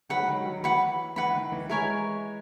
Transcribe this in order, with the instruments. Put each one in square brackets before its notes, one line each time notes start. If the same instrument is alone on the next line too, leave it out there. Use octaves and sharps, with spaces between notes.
[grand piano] D#3 F#3 [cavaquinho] B4 F#5 B5
[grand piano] G#3
D#3 F#3
D#3 F#3
[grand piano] E3 [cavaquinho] B4 F#5 B5
[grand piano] E3 [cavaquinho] B4 F#5 B5
[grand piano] D#3
E3
[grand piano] E3 G#3 [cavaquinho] E4 A#4 C#5 G#5